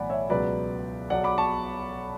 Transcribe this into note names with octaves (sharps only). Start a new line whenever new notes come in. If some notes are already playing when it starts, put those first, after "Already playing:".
Already playing: B1 A2 E3 D5 F#5 G#5 B5
C#5 E5
C#2 B2 F#3 B4 D5
B1 B2 F#3 D5 F#5
B5 D6
A5 C#6